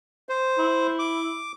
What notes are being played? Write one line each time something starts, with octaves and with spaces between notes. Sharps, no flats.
C5
E4
D6